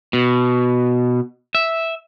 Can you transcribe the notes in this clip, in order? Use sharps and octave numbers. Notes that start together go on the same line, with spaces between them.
B2
E5